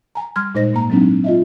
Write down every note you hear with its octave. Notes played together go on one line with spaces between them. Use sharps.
G#5 A#5
G3 C6 F6 G#6
A#2 G#3 D#4 C5 D#5 A#6
G#2 A#3 A#5
F#3 G#3 C4 D4 D#4
F4 D#5 E5